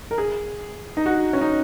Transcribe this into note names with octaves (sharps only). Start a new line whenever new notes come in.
A#4
G#4
D#4
F#4
C#4
D#4